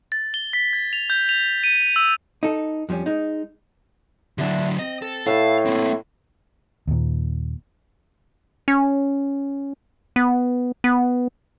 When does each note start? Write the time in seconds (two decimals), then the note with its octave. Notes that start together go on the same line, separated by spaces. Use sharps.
0.12 A6
0.34 G7
0.53 B6
0.73 G#6
0.93 F7
1.10 G6
1.29 F7
1.64 D#7
1.96 E6
2.43 D#4 A4
2.89 F2 F3 G3 C#4
3.06 G#3 D#4
4.38 D3 F#3 D4 E4 F#4
4.79 C4 D#5
5.02 A4
5.26 A2 A4 B4 E5 F5
5.66 A#3 C4
6.87 D#2 A#2
8.68 C#4
10.16 B3
10.84 B3